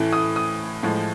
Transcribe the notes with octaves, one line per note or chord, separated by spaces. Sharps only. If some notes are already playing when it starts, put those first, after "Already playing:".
Already playing: A2 E3 A3
D#6
D#6
A2 F3 G#3